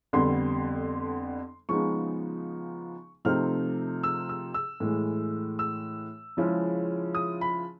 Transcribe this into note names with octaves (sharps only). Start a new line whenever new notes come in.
F2 D3 G3 B3 C6
C#3 F3 G#3 B3 D#4 C#6
C3 F3 A3 C4 D#4 F6
E6
E6
E6
A2 E3 G#3
E6
C#3 F3 G#3 C#4 E4
D#6
B5